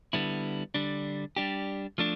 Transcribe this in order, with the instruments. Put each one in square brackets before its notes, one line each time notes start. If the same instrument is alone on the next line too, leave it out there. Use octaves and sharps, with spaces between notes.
[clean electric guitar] D3 G3 B3 E4
D3 G3 D4
G3 D4 G4
F3 A3 D4